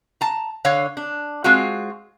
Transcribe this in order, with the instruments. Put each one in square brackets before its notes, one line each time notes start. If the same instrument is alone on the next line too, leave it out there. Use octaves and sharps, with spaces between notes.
[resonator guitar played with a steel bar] A5 A#5
D3 C#5 F5
D4
G#3 C4 F4 F#4